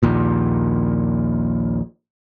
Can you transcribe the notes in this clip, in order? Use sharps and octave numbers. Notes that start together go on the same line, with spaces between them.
A#1 D#2 A#2